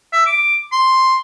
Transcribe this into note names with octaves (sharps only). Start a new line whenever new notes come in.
E5
D6
C6